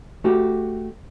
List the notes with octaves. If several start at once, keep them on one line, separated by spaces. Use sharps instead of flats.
A3 F#4 G4